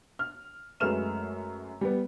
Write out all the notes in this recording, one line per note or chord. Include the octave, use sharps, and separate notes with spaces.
F6
F#2 G#3 A3 B4 F6 E7
G3 B3